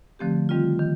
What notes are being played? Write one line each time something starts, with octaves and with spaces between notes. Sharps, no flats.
D3 F3 A3 C4 G4
D#3 G3 C4 F4
D#3